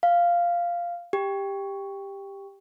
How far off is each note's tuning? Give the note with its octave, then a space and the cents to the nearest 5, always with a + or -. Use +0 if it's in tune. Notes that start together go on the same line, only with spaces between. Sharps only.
F5 -5
G4 +10